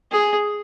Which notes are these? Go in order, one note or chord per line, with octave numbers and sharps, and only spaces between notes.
G#4